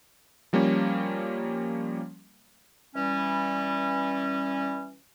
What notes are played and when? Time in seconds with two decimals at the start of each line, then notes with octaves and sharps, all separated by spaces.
0.53 F3 G3 A#3 C#4
2.96 E3 G3 C#4